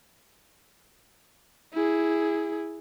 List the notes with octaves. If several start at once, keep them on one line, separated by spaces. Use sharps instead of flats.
E4 G#4